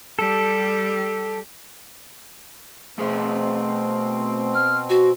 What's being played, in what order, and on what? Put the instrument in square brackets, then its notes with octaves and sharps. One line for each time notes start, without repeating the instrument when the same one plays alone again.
[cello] G3 G4 [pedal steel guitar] A4
[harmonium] B2 C4 [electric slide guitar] A3 G#4 A#4
[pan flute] F6
F#4